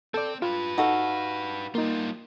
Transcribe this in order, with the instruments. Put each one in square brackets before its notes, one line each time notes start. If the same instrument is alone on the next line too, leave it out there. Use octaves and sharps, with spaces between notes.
[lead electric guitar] C4 [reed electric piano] A4 D5
[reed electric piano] F4 [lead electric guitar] G4 B4
[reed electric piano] D#4 [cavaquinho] F#4 A4 F5
[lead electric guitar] G3 F4 [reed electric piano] A#3 D#4